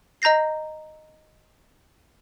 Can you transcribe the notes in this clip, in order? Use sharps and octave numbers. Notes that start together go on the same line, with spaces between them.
D#5 A#5 G6 A#6 C7